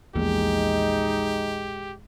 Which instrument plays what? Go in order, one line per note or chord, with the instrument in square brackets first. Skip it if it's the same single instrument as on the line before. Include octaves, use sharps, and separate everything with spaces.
[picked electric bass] A#1 E2 A#2 [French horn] G#3 [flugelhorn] D#4 [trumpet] G4